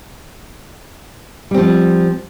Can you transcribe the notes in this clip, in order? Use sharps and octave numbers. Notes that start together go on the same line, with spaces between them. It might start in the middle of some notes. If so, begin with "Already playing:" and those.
F3 G3 C4